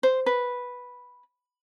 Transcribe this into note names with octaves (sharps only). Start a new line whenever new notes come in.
C5
B4